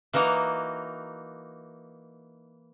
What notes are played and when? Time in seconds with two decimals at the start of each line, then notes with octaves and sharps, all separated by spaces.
0.13 E3 A#3 D#4 F#4 A#5